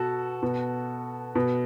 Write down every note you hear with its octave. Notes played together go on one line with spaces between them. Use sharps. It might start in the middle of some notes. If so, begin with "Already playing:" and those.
Already playing: B2 F#4 A4
B2
B2